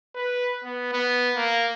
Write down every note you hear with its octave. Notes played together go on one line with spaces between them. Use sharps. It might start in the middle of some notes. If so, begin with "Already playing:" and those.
B4
B3
B3
A#3